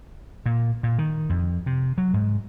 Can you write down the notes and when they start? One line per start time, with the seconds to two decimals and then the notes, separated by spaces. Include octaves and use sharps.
0.46 A#2
0.83 A#2
0.99 D#3
1.30 F2
1.66 C3
1.98 F#3
2.14 G#2